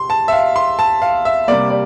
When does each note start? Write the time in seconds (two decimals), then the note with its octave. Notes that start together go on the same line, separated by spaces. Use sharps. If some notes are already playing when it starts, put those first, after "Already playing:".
Already playing: C3 C6
0.10 A5
0.28 E5
0.32 F5
0.56 C6
0.79 A5
1.02 F5
1.25 E5
1.48 C3 G3 A#3 D5
1.70 D5